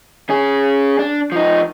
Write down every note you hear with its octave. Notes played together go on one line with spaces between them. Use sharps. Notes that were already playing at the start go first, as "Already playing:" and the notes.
C#4 G#4
D4
F3 D#4